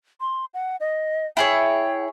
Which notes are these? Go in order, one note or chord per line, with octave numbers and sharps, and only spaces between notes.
C6
F#5
D#5
E4 G#4 C#5 G5